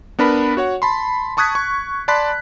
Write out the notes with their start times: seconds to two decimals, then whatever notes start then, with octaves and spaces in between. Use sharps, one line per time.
0.19 B3 D4 A#4 B4 B5
0.57 F#4 C#5 F#5
0.82 A5 B5 C6
1.37 A5 C#6 D#6 F#6 G#6 B6
1.55 C#6
2.08 D5 A5 B5 C6 F#6 B6